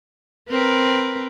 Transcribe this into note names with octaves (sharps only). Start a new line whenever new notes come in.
C4 A#4 B4